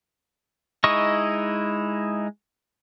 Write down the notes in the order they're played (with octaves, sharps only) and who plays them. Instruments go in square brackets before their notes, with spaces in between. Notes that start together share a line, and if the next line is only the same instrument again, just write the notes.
[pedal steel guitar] G#3 D#4 E4 D#5 C#6